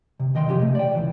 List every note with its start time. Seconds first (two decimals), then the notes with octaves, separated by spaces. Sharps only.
0.20 C3
0.35 D#3 D#5 G5 C6
0.47 C3 F3 F4 G4 G#4
0.60 C3 A3
0.75 D5 G5
0.95 C#2 E3